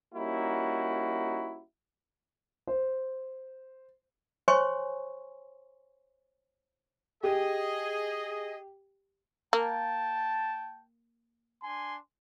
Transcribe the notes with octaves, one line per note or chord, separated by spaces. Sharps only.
G3 A#3 C#4 D#4 E4 F#4
C5
C5 C#5 G#5 C6 C#6
G4 G#4 D#5
A#3 G5 A5
D4 G#5 C6